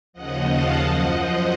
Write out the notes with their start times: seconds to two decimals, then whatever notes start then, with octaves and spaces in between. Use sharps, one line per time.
0.13 D#2 C#3 F3 D#5 F#5
0.47 F5 A5
0.80 F#2 F3 D#5 F#5
1.12 C5 D#5